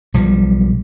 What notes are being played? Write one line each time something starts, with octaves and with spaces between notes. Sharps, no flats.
B1 F3 G3